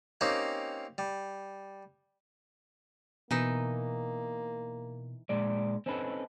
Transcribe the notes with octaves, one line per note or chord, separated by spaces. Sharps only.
A#3 C4 C#4 D#4 G4
G3
B2 E3 A#3 D#4
A#2 G#3 D5
C4 C#4 D#4 A4 B4